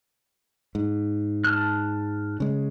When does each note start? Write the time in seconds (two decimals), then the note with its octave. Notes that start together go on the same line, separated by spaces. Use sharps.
0.75 G#2
1.44 A5 F6 F#6
2.40 C#3 G#3